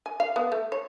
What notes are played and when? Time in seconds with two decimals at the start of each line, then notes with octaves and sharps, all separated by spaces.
0.06 G#5
0.20 F5
0.36 B3
0.52 A3
0.72 C#5